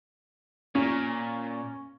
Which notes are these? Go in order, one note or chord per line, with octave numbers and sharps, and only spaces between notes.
A#2 C#4